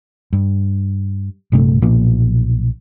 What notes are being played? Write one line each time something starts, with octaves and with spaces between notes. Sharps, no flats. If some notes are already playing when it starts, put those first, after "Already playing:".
G2
A#1 G2 C3 A3
B1 A#2 F3 A#3